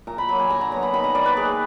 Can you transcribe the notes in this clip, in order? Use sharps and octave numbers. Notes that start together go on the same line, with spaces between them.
A#2 A#5
B5
F#3 A#3 B5
G#5
D3 A#5
A#5
F#3 B3 A#5
B5
D#3 B5
A#5
A#3 D5
B4
D#3 G#4